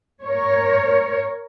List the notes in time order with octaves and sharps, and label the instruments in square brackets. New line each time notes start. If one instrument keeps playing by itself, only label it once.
[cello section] A#4 C#5